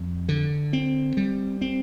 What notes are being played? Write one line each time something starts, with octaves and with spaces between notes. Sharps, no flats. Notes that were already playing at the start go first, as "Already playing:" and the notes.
Already playing: F2
D3
C4
G3
C4